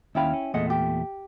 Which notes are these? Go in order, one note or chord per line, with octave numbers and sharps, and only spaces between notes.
D#2 C#4 E4 F5 G5 B5
C#4
E2 A#2 A3 G#4 D#5 F#5
G4